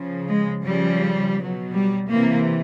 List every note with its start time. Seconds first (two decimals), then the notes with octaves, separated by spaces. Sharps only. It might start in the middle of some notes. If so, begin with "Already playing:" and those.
Already playing: C#3 F3
0.27 G#3
0.63 C#3 F3 G3
1.36 B2 F#3
1.73 G3
2.09 C3 E3 A#3